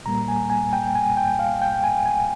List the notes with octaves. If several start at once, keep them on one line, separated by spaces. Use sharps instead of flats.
A#2 G3 A#3 A#5
G#5
G#5
G5
G#5
G5
F5
G5
G#5
G#5